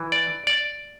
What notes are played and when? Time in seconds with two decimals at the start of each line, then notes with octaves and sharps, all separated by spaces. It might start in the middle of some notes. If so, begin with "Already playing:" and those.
Already playing: E3
0.12 D5
0.47 D5